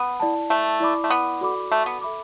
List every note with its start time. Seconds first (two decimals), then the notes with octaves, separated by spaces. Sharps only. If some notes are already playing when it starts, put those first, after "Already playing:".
Already playing: B3
0.20 E4 D5 A5
0.50 A3
0.80 E4 D5 B5 D6
1.04 A3
1.10 B3
1.41 F#4 A4 D5 B5 D6
1.72 A3
1.86 B3
2.01 A4 E5 B5 D6